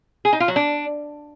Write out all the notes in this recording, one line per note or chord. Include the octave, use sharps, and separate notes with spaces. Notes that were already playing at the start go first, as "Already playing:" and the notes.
G#4
D#4
F4
F#3
D4